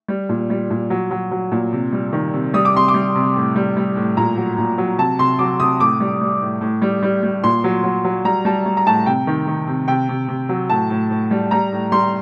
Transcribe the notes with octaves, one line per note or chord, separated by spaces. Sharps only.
G3
A#2
G3
A#2
F#3
F#3
F#3
A#2
C3
G3
D#3
C3
G3 D#6
D6
C3 C6
D6
G3
C3
A2
G3
G3
A2
A#2 A#5
F#3
A#2
F#3
C3 A5
C3 C6
F#3 D6
C3 D#6
A2 D6
G3
G3
A2
A2
G3
G3
G3
A#2 C6
F#3
F#3
F#3
G3 A#5
G3 A5
G3
A#5
A2 A5
C3 G5
D#3
D#3
C3
C3 G5
C3
C3
F#3
A2 A5
A2
A2
G3
G3 A#5
A2
G3 C6